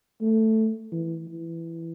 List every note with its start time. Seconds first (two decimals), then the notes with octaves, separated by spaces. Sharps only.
0.21 A3
0.92 E3
1.28 E3